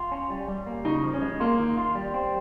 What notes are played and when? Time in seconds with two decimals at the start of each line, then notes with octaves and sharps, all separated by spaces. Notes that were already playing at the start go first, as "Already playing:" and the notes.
Already playing: F4
0.12 C#4
0.30 G3
0.48 G3
0.66 A#3
0.85 C#3 D#4
1.03 F3
1.13 C#4
1.22 G#3
1.40 A#3 F4
1.59 D#3
1.77 F4
1.95 G3
2.14 C4